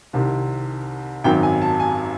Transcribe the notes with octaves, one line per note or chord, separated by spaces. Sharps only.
C2 C3 D#3
G#1 F#2 D#3 F#3 G5
G#5
A5
G#5